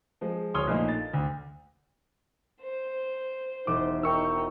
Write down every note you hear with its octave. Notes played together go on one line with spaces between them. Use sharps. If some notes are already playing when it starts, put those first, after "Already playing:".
F3 G#3
D1 C#5 C6 D#6 F6 G7
A#1 A3 A#3 D#4
A6
D2
C5
E1 D#4 D6
D#4 A#4 G5 C#6 E6